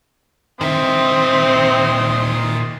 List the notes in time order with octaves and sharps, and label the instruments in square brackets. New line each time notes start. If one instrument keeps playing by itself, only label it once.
[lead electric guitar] A#2 E5 [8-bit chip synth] D#3 [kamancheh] C4 [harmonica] C6 D#6